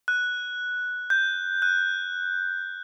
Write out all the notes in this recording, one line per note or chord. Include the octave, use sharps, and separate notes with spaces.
F#6
G6
F#6